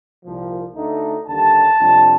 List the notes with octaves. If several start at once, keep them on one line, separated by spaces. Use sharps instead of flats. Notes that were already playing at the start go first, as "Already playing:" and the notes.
C2 A#2 F3
D2 D3 A3 D#4
D#2 D3 G3 A5
F2 C3 G3 D4 F4